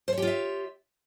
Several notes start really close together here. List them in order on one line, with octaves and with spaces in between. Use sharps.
C5 C#5 G4 F4 E5